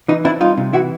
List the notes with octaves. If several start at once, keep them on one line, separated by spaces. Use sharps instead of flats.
E3 D#4
C4 D4 E4
G3 D#4 F4
C3
E3 E4 F#4